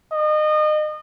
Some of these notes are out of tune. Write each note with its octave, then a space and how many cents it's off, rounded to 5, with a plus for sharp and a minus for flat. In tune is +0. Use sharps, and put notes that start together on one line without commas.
D#5 -30